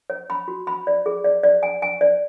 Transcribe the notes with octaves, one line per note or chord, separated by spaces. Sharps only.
C#5
B5
F#4
B5
D5
G#4
D5
D5
G#5
G#5
D5